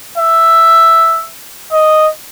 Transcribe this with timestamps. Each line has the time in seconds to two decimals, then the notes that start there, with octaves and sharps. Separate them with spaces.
0.18 E5
1.72 D#5